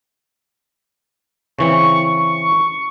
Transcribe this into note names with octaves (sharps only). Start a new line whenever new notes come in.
C#3 E3 C4 C#6
C#6